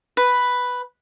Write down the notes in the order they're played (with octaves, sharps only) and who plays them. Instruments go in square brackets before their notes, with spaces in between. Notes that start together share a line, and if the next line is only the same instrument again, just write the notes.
[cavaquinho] B4